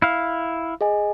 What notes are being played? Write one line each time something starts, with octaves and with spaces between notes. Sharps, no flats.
E4 F5
G#4 D#5 G#5